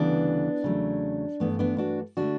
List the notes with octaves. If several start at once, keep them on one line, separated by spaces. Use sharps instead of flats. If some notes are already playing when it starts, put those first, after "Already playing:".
Already playing: D2 C#3 E3 G3 B3 D4
E2 C#3 F#3 A3
G2 E3 A3 B3
B3 D4
D4 F#4
D3 A3 D4 F#4